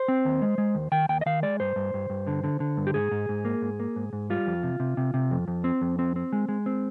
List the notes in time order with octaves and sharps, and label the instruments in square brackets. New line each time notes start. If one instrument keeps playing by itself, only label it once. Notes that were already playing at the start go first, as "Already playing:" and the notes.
Already playing: [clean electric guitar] C5
C4
D#2
G#3
G#3
D#2
D#3 G5
D#2 G5
D#5
D#3 F5
G#3 D5
G2 C5
G2
G2
G2
D3
D3
D3
G2
G4
G#2 G#4
G#2
G#2
A#3
G#2
A#3
G#2
G#2
G3 F4
F2
C3
C3
C3
C3
F2
F2
C4
F2
C4
C4
G#3
G#3
C4